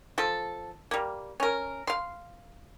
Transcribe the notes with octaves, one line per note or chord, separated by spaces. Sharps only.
F3 A4
G3 A#3
C#4 A#4
F5 C6